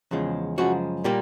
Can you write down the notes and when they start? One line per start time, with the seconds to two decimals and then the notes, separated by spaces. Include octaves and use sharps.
0.11 E2 C#3 F3 G#3
0.58 F#2 C#3 F3 G#3 F#4
1.04 A#2 G3 A#3 G4